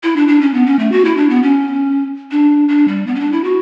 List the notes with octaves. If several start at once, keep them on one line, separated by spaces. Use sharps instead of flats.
E4
D4
D4
C#4
B3
C#4
A3
F#4
E4
D4
B3
C#4
D4
D4
G3
B3
C#4
D4
E4
F#4